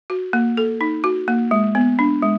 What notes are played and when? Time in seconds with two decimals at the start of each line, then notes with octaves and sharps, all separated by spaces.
0.10 F#4
0.33 A#3
0.57 A4
0.81 D#4
1.04 F#4
1.28 A#3
1.51 G#3
1.75 B3
1.99 D4
2.22 G#3